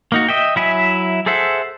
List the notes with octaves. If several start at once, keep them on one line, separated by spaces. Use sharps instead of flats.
A#3 D#4 F#4
D#5 E5 G5
F#3 E4 E5 G#5
G#4 A4 C5 E5 F#5